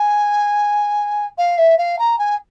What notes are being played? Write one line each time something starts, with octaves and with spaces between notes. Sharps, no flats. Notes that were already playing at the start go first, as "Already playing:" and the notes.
Already playing: G#5
F5
E5
F5
A#5
G#5